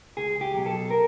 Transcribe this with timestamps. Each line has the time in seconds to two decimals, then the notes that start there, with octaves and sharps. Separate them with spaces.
0.17 C#2 G#4
0.41 G4
0.54 B2 F#3
0.66 A4
0.90 A#4